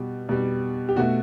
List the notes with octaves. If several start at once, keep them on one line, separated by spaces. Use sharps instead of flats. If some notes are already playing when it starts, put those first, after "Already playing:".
Already playing: B2 G3
B2 G3
G4
B2 A3 F#4